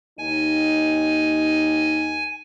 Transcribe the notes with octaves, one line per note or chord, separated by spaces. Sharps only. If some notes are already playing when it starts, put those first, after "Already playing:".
D#2 D#4 G#5